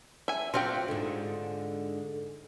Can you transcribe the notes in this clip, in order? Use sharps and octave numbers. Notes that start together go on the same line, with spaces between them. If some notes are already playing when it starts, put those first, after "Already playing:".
E5 G#5
F#3 C4 F4 G4 F5 G5
G#2 D3